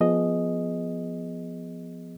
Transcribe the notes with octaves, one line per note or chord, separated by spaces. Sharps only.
F3 B3 G#4 D#5